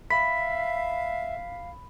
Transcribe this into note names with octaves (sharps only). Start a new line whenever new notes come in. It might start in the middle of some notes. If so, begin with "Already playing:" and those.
E5 F5 B5 B6